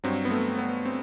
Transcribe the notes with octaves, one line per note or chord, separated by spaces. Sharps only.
G2 F#3 C4
B3
A3
B3
C4